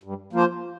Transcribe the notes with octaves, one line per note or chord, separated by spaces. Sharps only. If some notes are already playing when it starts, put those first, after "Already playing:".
G2
F3 A#3 F4 C5